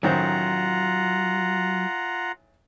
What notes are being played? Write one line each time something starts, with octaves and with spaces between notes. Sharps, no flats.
A1 D#3 F#3 F4 C5 F#5 A#5